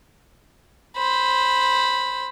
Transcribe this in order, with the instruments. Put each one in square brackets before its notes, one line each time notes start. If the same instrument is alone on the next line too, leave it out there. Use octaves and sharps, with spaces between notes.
[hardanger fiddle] C5 B5